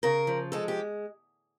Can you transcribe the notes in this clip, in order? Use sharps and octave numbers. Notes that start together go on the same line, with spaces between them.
C#3 A#4
F3
G#3 A4
G4